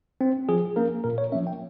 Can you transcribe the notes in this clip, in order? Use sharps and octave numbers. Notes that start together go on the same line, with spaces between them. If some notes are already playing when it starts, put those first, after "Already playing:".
C4
F3 G#4
A#3 C#4 A#4
A#2 A#4
C#5
F3 A#3 C#4 E5
G5